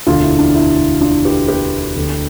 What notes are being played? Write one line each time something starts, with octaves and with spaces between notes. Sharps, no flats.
E1 D2 D3 D4 F4
E4
D4
E4
D4 F4
G4 B4
G4 B4
D2 D3